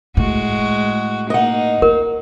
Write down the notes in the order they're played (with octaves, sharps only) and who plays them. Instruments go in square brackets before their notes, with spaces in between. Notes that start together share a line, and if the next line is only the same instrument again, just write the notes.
[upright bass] A2 [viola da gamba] G#3 F#4
[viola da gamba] A#3 D#4 [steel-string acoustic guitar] D#5 F#5
[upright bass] F4 [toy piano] A#4